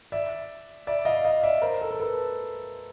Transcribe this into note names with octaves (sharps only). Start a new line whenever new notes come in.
D5 E5
D5 E5
D#5 F5
D#5 F5
D5 E5
A#4 C5
A4
A#4
A4 B4